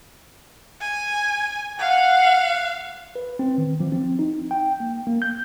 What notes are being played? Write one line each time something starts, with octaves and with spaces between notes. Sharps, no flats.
G#5
F5 F#5
B4
C4
D#3
F3
C4
D#4
G5
A#3
A#3
G6